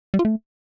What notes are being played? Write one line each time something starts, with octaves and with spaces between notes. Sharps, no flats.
G3
F4
A3